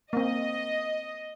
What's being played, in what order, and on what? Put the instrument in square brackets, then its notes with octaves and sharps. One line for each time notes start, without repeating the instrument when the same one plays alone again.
[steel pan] A#3 C4 [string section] D#5